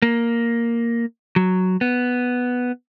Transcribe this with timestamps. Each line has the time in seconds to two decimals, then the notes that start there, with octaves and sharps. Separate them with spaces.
0.02 A#3
1.36 F#3
1.81 B3